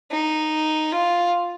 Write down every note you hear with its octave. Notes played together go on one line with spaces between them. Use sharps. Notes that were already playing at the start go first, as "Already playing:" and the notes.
D#4
F4